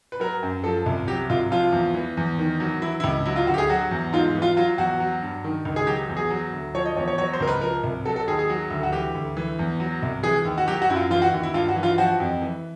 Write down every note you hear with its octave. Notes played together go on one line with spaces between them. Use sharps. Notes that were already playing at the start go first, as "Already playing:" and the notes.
B4
F#3 A#4
F#2
F3 A4
C2
F#3 G4
C2 F4
F3 F4
E2
E3
E2
D#3
F#3
E3 E4
E4
C#2
F#3 E4
F4
D2 F#4
G4
G#4
F#3 F#4
E2
G#2 F4
E3
F4
F#3 F4
E2 F#4
F#3
G2
D#3
C#2
G#4
F#3 G4
E2
G#4
F#3
D2
F3 C#5
D#5
E2 C#5
C#5
F#3 C#5
C5
C#2 A#4
B4
F3 A#4
C2
F#3 A4
A4
D#2 G#4
G#4
F#3
D2
F#4
E3 G4
D2
E3
E2
F#3
C2
E3 G#4
D#2
F#4
F#3 G4
F#4
F#2 E4
F4
E3 F4
F#4
D#2
E4
G2 F4
F#4
E3
F4
F3 F#4
F2
E3